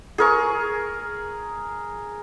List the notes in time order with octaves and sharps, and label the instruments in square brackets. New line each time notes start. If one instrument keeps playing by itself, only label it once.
[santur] G#4 A#4 C#6